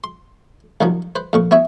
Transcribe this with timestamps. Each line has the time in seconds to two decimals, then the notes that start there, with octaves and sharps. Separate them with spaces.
0.04 C6
0.81 C2 D#3 F3 F#3
1.16 B4 C5
1.33 F2 A#2 C#6
1.51 B3 E4 C#5 E5